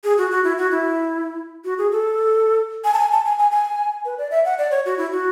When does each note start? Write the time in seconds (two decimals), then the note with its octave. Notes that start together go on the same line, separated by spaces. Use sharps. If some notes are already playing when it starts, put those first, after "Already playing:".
0.04 G#4
0.18 F#4
0.31 F#4
0.44 E4
0.58 F#4
0.71 E4
1.64 F#4
1.78 G#4
1.92 A4
2.84 G#5
2.94 A5
2.99 G#5
3.11 A5
3.25 G#5
3.38 G#5
3.51 G#5
4.05 B4
4.18 D5
4.31 E5
4.45 F#5
4.58 D5
4.71 C#5
4.85 F#4
4.98 E4
5.12 F#4